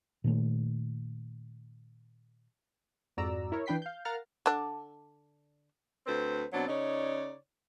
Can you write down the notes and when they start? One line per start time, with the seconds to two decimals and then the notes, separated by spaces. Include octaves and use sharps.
0.24 A#2 D#3 A3
3.17 F2 G#2 F#4 D5 A#5 E6
3.52 E4 A#4 C#5
3.66 E3 D4 B4 G5 B6 C7
3.82 F5 G6
4.05 A#4 F5 F#5 A#5 F6 A6
4.46 D3 D4
6.07 D2 C4 B4 C5
6.53 B2 F#3 C4 D4
6.68 C#3 D#4 C#5 D5